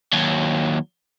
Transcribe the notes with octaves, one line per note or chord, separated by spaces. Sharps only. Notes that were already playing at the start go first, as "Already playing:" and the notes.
D#2 F#3